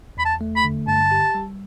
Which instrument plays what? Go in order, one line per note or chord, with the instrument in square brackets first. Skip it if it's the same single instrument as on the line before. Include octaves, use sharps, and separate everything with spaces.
[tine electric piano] E2 [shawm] B5
[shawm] A5
[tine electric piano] A3
[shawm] B5
[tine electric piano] D3
[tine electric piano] G2 [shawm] A5
[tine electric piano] G4
G3